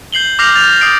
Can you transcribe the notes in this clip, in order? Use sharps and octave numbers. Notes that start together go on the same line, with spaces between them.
G6 C7 F#7 G7
D6 F6 G6 A#6 C7 F7
F6 G6 A6 F7
D#6 A6 C7 D7